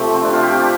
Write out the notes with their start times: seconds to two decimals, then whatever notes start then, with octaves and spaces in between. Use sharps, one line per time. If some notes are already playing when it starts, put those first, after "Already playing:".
Already playing: C3 F3 A3 G4 A4
0.14 C4
0.23 D4
0.33 F4
0.42 G4